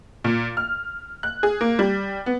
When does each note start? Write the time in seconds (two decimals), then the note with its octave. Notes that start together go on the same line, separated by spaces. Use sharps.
0.24 A#2
0.57 F6
1.23 F#6
1.43 G#4
1.61 A#3
1.79 G3
2.26 B3